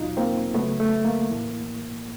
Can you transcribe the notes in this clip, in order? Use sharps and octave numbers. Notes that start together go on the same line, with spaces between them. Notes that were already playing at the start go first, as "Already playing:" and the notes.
Already playing: E2 B2 F#3 D#4 F4
A#3 C4
F#2 C#3 F#3 A3 B3
A3
A#3
A2 E3